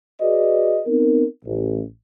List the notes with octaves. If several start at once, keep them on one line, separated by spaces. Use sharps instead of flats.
F#4 G#4 B4 D5 D#5
B3 C4 D#4 A#4
A1